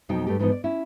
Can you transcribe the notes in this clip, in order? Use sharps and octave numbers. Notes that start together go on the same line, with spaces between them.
F2 B2 F#3 D#4 G5
G2 A3 G4
G#2 E3 F3 B3 D#4
D5
C#4 E4